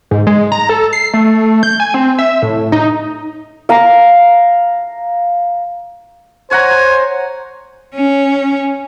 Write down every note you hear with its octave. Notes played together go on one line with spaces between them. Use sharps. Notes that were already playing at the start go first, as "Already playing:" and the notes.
G#2
G#3
A#5
A4
C7
A3
G6
G#5
C4
E5
A2
D#4
F5 A#5
C5 C#5 F#5 G#5 A#5
C#4